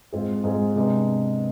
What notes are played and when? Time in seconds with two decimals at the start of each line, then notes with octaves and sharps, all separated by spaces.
0.12 G#2 G#3 C4 F4 G#4
0.44 G#2 G#3 C4 F4 G#4
0.76 C3 G#3 B3 D4